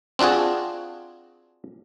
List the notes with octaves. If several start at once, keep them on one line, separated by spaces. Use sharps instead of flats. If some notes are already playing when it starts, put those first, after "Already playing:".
C4 D4 F4 F#4 G#4